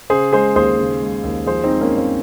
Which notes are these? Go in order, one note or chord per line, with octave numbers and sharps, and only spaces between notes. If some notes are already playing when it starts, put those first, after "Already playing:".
C#3 G#4 C5
G#3 G#4 C5
D#2 G#4 C5
C#3
G#3
D#2
F3 G#4 C5
C4 D#4
G#3
A#3 C#4
G2
C4